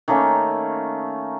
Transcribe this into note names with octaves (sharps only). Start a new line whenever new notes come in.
D#3 A3 A#3 C#4